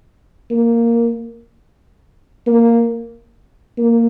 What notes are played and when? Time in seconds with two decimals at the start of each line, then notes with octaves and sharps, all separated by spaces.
0.50 A#3
2.47 A#3
3.78 A#3